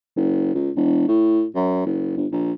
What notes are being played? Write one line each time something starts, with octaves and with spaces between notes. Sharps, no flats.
F#1
C#2
E1
A2
F#2
F#1
G1
A#1